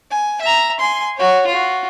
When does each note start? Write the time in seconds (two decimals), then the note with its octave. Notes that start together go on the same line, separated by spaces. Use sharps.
0.11 G#5
0.42 E5 A#5
0.80 G#5 C6
1.17 F#4 C#5
1.47 F4 F#4